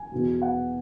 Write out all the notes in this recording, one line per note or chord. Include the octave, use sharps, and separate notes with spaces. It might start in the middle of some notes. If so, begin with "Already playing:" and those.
Already playing: G#5
E2 B2 F#3
F#5